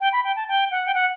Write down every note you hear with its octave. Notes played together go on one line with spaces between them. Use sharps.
G5
B5
G5
A5
G5
F#5
G5
F#5